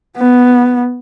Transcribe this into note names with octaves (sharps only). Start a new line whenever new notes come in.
B3